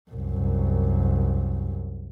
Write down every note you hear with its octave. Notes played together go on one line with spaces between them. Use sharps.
C2 F#2